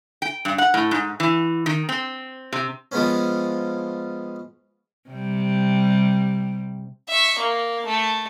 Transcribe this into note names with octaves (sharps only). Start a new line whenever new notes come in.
G5
G2
F#5
A2
G#2
E3
D#3
C4
C3
F3 G#3 B3 C#4
C3 G3
E5 C#6
A#3
A3